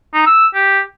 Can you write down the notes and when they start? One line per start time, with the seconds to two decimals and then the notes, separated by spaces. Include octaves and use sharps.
0.14 D#4
0.26 E6
0.55 G4